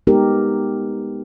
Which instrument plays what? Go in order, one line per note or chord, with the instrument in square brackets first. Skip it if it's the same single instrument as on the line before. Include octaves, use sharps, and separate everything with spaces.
[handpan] G#3 B3 D#4 G4 A#4